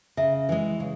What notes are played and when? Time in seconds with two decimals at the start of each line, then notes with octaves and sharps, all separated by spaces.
0.17 C#3 E5
0.49 E3 G#3
0.80 C#3